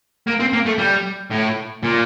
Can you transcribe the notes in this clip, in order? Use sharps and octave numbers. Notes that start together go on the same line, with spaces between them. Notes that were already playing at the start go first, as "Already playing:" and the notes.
A#3
C4
A#3
A3
G3
A2
A#2